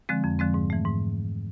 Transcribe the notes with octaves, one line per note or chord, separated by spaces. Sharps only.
D3 F3 G#3 C4
F2
D3 F3 G#3 C4
G#2
E3 A3
G#2